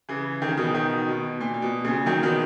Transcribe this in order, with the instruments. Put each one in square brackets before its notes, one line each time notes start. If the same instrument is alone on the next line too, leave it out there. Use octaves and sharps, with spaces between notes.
[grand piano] C#3 E3
D#3
C#3
B2 D#3
B2 D#3
B2
A#2
A#2
B2
A#2 C#3
D#3 F#3
B2 D#3